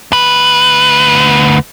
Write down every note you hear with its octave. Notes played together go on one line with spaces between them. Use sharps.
D2 B4